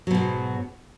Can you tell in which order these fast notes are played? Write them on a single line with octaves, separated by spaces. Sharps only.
F#3 B2 G#2